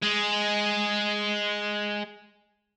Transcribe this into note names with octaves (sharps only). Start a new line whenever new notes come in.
G#3 G#4